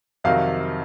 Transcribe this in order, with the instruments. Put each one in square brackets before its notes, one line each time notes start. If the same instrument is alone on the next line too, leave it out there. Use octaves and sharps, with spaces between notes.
[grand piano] F2 C3 D#3 F#3 F5